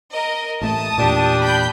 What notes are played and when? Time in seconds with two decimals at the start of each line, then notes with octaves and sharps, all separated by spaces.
0.12 A#4 D#5
0.62 A1 A3 A5 D#6
0.98 E2 A#2 D4 G4
1.41 B5 G6